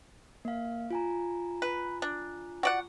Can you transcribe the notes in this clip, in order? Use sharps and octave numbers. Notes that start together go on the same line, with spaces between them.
A#3 F5
F4 G#5 A#5
B4
D4
F#4 D5 F#5